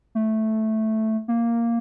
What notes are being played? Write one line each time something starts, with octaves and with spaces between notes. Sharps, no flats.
A3
A#3